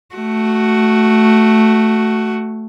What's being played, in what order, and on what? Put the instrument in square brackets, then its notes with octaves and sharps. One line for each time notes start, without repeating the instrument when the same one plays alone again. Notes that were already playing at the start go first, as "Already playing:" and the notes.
[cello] A3 F#4